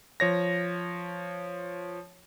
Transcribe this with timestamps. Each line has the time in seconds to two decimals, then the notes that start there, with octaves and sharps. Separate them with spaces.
0.20 F3 C#5 A#6